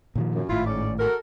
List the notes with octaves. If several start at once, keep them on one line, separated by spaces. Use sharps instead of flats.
A#2 D#3 F3
F#2
G#1 A2 E4 F4
G#2 C#4 D5
F#4 A4 A#4